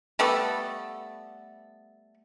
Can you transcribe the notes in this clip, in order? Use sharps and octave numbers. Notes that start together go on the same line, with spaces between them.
G3 A3 B3 A4